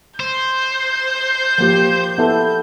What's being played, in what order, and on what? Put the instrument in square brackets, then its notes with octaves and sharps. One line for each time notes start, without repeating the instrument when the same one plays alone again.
[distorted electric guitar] C5 [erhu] G6
[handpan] F3 A#3 G4
B3 E4 A4